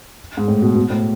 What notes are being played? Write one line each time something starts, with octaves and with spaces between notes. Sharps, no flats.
G#2
A2
B2
B2
A2